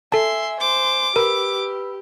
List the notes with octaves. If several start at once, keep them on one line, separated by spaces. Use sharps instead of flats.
A4 E5 G#5 A5 C6
C5 D6
G4 A#4 B4 B5 E6